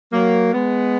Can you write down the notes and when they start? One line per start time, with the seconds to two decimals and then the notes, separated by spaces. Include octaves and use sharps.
0.12 F#3 A#3
0.54 G#3 B3